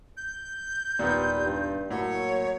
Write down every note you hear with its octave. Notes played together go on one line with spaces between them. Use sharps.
G6
D#2 A#2 G3 B3
G2
A2 F#3 A#3 C#5